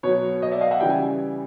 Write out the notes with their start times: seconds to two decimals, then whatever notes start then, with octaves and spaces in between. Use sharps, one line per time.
0.03 B2 F#3 B4 C#5
0.42 C#5 D#5
0.52 D5 E5
0.61 D#5 F5
0.71 E5 F#5
0.80 C#3 E3 G3 G5
0.90 G#5